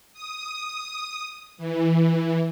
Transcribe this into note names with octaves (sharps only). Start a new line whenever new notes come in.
D#6
E3